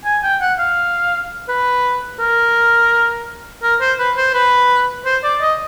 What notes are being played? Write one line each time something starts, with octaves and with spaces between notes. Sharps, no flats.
G#5
G5
F#5
F5
B4
A#4
A#4
C5
B4
C5
B4
C5
D5
D#5